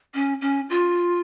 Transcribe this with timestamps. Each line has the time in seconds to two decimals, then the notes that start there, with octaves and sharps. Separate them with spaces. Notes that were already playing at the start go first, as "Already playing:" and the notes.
0.14 C#4
0.41 C#4
0.70 F4